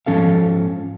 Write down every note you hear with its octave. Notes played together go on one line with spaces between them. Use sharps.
G#2 F3 C#4 A4 F5